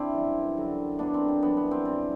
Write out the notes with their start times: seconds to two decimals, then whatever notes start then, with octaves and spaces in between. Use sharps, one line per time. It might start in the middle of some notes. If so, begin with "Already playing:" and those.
Already playing: C4 D4 E4
0.13 F#2 E3 G3
0.57 F#2 D3 F#3
0.99 F#2 D3 F#3 B3 D4
1.14 C4
1.28 C4
1.42 F#2 E3 G3 B3 D4
1.57 B3
1.71 C4
1.85 F#2 E3 G3 C4